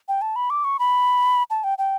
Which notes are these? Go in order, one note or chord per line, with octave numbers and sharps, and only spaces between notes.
G5
A5
B5
D6
C#6
B5
A5
G5
G5